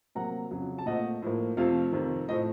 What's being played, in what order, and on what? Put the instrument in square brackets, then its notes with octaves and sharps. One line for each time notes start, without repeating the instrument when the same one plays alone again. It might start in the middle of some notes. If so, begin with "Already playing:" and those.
[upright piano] C3 F#3 A#3 F#5 A#5
F2 C#3 F#3
A5
A#2 A3 C4 D#5 F#5
A2 F3 A#3
F2 C3 F3 A3 C4 F5
F2 C3 D#3
A2 F3 A3 C4 D#5